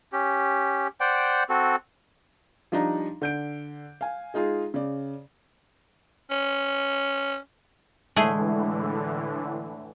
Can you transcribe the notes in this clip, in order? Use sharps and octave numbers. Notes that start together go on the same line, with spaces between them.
C#4 G4
C5 D5 F#5 G5
C4 F#4 A4
F3 G3 D4 D#4 A#5
D3 G6 D7
F5 G#5
G#3 D#4 F4 G#4
C#3 D5
C#4
A2 D3 E3 G#3 A3 G#4